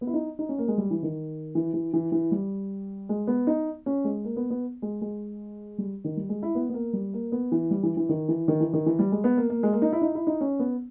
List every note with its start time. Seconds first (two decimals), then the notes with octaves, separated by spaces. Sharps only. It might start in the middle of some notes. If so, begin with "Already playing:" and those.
0.01 B3
0.07 E4
0.14 D#4
0.39 D#4
0.49 C#4
0.58 A#3
0.68 G#3
0.78 G3
0.91 E3
1.03 D#3
1.55 E3
1.74 E3
1.93 E3
2.12 E3
2.31 G3
3.09 G#3
3.27 B3
3.47 D#4
3.86 C#4
4.04 G#3
4.25 A#3
4.36 B3
4.50 B3
4.82 G#3
5.01 G#3
5.78 G3
6.04 D#3
6.17 G3
6.29 G#3
6.43 E4
6.55 B3
6.69 B3
6.74 A#3
6.93 G3
7.13 A#3
7.32 B3
7.52 E3
7.71 G3
7.83 E3
7.97 E3
8.09 D#3
8.29 E3
8.48 D#3
8.60 E3
8.73 D#3
8.86 E3
8.99 G3
9.12 G#3
9.24 B3
9.37 A#3
9.50 A#3
9.63 G#3
9.73 A#3
9.82 D#4
9.93 E4
10.02 D#4
10.15 E4
10.27 D#4
10.41 C#4
10.59 B3